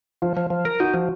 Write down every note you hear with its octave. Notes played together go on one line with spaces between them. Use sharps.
F3 F4
F3
F3
A#4
D#4 F#4
F3